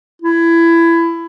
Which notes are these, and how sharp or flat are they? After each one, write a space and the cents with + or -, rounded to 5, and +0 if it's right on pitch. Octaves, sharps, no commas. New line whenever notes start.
E4 +20